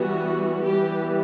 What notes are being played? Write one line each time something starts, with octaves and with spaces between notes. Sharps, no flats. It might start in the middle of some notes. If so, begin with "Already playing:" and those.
Already playing: E3 G3 B3 F#4
E3 G3 B3 G4